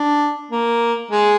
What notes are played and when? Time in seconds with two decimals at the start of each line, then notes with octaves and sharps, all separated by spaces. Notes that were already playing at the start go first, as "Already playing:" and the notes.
Already playing: D4
0.51 A#3
1.11 G#3